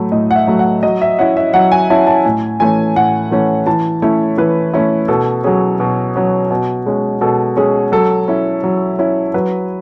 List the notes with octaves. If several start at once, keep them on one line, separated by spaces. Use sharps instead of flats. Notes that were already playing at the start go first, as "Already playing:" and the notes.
Already playing: A2 F#3 A3
A2 D#5
F#5
E5
F#3 A3
F#5
F#3 D#5
E5
C#4 E4 F#5
E5
F#3 F#5
G#5
C#4 E4 A5
A5
A2 G#5
E3 A3 C#4 G#5
A2 F#5
E3 A3 C#4
E3 A5
A3 C#4 E4 C#5
E3 B4
A3 C#4 E4
B2 A4
F#3 C#4 G#4
B2
F#3 C#4
B2
G#3 C#4
B2 A4
G#3 C#4 G#4
F#3 A4
C#4 E4
F#3
C#4 E4
F#3 B4